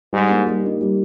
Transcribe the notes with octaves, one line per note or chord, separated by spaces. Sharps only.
G#2 G3
A#3 D#4
G3
A#3 D#4
G3